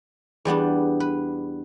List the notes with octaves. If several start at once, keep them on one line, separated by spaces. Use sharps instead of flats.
E2 G3 B3 D4
B4